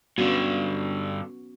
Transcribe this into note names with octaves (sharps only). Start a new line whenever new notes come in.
G2 D3 B3 C#4 F#4